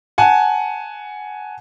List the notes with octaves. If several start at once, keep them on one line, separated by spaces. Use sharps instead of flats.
F#5 G#5 A5